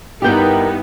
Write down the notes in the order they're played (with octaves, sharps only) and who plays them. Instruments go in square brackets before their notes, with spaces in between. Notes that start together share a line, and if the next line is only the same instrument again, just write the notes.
[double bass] G2 E4 [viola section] B3 D#4 [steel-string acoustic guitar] G4 G5 [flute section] A#4